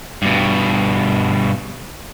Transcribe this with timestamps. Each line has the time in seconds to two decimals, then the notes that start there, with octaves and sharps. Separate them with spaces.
0.22 G2 B2